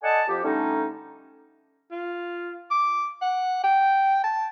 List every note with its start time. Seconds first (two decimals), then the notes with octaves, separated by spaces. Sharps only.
0.02 A4 D5 D#5 F#5 G#5 A5
0.27 F2 G4
0.43 D3 G3 A3 C#4 D#4
1.92 F4
2.71 D6
3.22 F#5
3.64 G5
4.24 A5